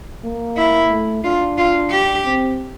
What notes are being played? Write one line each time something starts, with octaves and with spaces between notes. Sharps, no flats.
A#3
E4
A3
D4 F4
F4
G4
C4